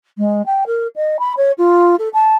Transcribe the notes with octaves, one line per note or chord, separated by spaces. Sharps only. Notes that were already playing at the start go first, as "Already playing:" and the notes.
G#3
G5
A#4
D#5
B5
C#5
F4
A4
A5